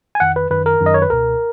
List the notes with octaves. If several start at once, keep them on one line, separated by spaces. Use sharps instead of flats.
G#5
F2 D#3 F#5
B4
F#2 D#3 B4
A#4
F#2 D#3
D#5
C#5
B4
C#2 B2 A#4